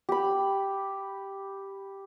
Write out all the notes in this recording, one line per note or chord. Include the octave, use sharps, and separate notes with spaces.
G4 B5